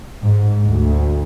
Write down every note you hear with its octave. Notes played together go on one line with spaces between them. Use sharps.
G#2
D2